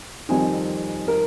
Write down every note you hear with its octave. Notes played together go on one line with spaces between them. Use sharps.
F2 D#3 G3 C4 D#4 G#5
A#4